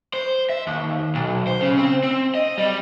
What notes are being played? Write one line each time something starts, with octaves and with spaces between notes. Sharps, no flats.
C5
E5
D#2
B1
C5
C#3
C4
C4
D#5
G3